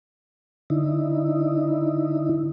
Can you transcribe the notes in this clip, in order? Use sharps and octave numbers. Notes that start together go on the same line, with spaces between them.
D3 D#4 E4